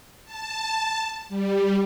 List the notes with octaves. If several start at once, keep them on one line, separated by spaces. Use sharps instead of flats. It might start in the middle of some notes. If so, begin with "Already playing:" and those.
A5
G3